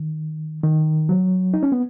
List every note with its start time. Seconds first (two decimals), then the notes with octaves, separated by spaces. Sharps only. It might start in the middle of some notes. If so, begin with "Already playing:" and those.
Already playing: D#3
0.64 D#3
1.09 F#3
1.54 D#4
1.63 C#4
1.72 B3